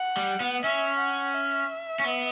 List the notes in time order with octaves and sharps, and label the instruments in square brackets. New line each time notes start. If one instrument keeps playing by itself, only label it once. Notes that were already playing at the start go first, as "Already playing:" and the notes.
Already playing: [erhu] F#5
[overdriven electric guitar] G3
B3
[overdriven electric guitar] C#4 [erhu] E5
[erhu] F#5
E5
[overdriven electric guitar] C#4
B3